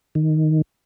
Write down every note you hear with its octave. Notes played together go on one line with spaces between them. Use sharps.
D#3